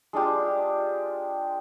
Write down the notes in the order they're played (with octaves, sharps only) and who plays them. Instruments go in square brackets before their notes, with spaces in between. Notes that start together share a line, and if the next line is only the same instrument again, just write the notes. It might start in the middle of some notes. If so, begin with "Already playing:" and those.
[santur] G#3 D4 F4 G4